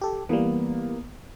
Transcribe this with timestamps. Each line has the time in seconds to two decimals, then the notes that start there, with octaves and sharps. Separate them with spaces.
0.01 G4 A4
0.29 E3 G3 A#3 B3